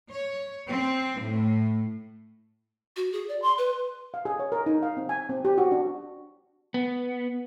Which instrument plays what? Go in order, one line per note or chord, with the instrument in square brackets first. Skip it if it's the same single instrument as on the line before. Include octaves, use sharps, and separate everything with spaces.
[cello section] C#5
C4
A2
[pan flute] F#4
G#4
D5
C6
B4
[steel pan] F5
G#4
C#5
A#4
D#4
F5
C4
G#5
C4
G4
F#4
D4
[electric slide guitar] B3